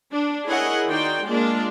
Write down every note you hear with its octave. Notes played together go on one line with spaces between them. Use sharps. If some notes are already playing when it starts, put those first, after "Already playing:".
D4
E4 G#4 A#4 C#5 D#5 F#5
D#3 D#4 F#4 D5 G5 C6
G#3 A#3 D4 F4 D5